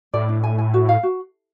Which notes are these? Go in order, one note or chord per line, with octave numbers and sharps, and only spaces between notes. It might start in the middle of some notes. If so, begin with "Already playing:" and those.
A2 D5
D4
G#5
G#5
F#4
F5
F#4